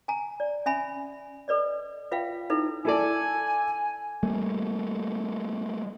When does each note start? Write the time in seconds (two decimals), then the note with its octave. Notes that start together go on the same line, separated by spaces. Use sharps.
0.08 G#5 A#5
0.40 D5
0.66 C#4 E5 G#5 B5
1.48 A4 B4 D5 D#5
2.12 F4 B4 E5 F5 G5
2.50 D#4 E4 A4 B4 E5
2.85 E4 A4 D5 G#5
4.23 G3 A3 A#3